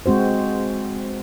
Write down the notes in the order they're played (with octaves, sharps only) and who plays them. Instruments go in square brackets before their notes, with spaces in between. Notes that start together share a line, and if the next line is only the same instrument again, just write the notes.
[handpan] G#3 C4 F#4 C5